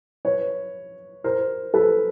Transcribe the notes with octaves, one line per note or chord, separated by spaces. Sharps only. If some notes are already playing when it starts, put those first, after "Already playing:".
B4 C#5
A#4 C5
A4 B4